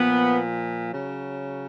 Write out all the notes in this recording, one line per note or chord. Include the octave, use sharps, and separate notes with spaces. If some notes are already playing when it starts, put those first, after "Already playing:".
Already playing: A#2 F3 B3
C#3 F#3